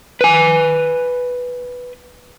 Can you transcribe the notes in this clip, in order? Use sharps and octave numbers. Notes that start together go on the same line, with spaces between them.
B4 G#5